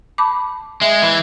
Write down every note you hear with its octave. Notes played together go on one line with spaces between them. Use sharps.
A5 B5 D6
G#3 E5
E3